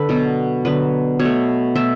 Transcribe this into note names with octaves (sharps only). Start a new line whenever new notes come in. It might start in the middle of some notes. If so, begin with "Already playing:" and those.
Already playing: D3 A4 B4
B2 F#3 B3
D3 F#3 B3 B4
B2 C#5
A3
B2 A3 E5